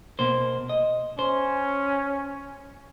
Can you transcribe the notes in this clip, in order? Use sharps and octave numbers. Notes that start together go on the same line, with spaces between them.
B2 A#3 C5
D#5
C#4 C5